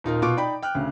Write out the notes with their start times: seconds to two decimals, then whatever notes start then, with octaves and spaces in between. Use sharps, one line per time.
0.04 D#1 D#4 F4 A#4
0.22 B2 F4 F5 C#6 D6 D7
0.36 D#4 D5 G5 B5
0.63 G5 F6 F#6
0.75 D2 C#3